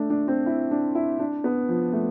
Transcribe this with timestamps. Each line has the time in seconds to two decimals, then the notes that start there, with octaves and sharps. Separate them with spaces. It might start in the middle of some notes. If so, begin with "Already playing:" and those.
Already playing: A3 D4
0.10 D4
0.28 C4
0.46 E4
0.71 D4
0.95 E4
1.19 D4
1.44 B3
1.69 F3
1.93 A3